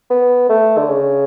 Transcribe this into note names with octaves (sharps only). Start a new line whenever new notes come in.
B3
A3
D3
C#3